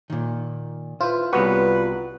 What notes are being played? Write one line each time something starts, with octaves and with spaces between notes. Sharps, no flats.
A#2 D#3
E4 F4 B4 C5
C2 G3 B3 F#4 B4 C#5